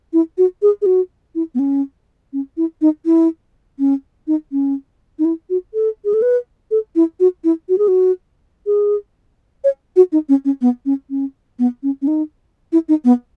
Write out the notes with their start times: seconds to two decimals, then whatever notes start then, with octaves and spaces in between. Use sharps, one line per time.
0.13 E4
0.38 F#4
0.62 G#4
0.82 G#4
0.86 F#4
1.35 E4
1.55 B3
1.59 C#4
2.33 C#4
2.57 E4
2.82 D#4
3.06 E4
3.79 C#4
4.27 D#4
4.52 C#4
5.19 D#4
5.25 E4
5.50 F#4
5.74 A4
6.05 G#4
6.14 A4
6.22 B4
6.71 A4
6.96 E4
7.20 F#4
7.44 E4
7.69 F#4
7.78 G#4
7.88 F#4
8.66 G#4
9.64 C#5
9.96 F#4
10.12 D#4
10.29 C#4
10.45 C#4
10.61 B3
10.86 C#4
11.10 C#4
11.59 B3
11.83 C#4
12.02 C#4
12.07 D#4
12.72 E4
12.89 D#4
13.05 B3